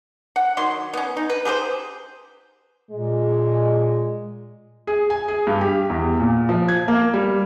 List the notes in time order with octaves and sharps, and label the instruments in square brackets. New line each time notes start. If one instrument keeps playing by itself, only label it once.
[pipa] F#5
D#3 F#3 C6
B3 C#4
D#4
B4
G4 G#4 A#4 C5
[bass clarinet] A#2 [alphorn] G#3
[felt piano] G#4
G#5
G#4
G2
G4
E2
A#2
F3
G#6
A#3
G3